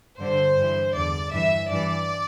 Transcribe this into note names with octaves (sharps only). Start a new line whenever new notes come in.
G2 D3 C5
G2 E3
E2 D3 D5
G2 E3 E5
G2 E3 D5